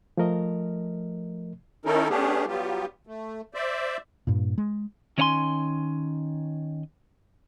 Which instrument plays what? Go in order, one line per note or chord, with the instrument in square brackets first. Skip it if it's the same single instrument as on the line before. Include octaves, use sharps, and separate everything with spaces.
[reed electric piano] F3 A3 A#4 D#5
[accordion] D#3 C#4 D#4 E4 A4 A#4
A3 B3 C#4 D4 G4 G#4
F#3 G3 B3 F4 G4
A3
C5 D5 E5
[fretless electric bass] G2 A#2
G#3
[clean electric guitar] D#3 C#4 C#5 D#5 G#5 C6